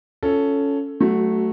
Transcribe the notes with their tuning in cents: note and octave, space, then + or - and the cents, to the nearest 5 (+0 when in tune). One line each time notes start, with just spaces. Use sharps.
C#4 +10 F4 +0 A4 +0
F#3 +20 A3 +0 F#4 -5